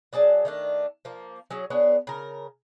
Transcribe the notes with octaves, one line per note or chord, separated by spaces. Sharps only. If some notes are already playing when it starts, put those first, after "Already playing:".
F#3 D4 G#4 A5
D#3 A3 D4
F3 A#3
F#3 C#4 G#4
B3 D4 G#4 C#5
C#3 A#4